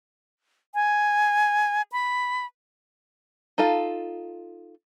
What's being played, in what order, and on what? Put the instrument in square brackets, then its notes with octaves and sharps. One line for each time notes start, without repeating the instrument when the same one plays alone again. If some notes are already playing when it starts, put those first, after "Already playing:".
[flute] G#5
B5
[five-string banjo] D#4 F4 A4 F5